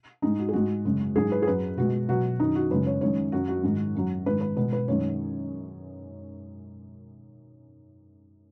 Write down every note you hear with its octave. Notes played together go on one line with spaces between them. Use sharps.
G#2 G#3 D#4
F#4
G#4
G#2 G#3 F#4
F#2 C#3 G#3
G#2 F#3 G#4
B4
G#4
F#2 F#3 B4
B2 G#3 F#4
B2 F#3 F#4
F#2 D#3 F#3 D#4
F#4
F#2 C#3 G#3 B4
C#5
F#2 D#3 G#3 C#5
F#2 F#3 F#4
F#4
G#2 D#3 G#3
F#2 F#3
G#2 D#3 G#3 B4
B4
B2 G#3 B4
B4
F#2 D#3 G#3 C#5